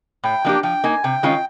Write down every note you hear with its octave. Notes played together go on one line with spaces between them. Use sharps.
A2 G5
F3 A#3 D4 G4
F3 G5
A#3 D#4 G#5
C3 G5
D#3 G#3 C#4 F4